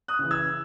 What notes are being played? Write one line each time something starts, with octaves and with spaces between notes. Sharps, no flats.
D#6 F#6
C#3 E3
E6 G#6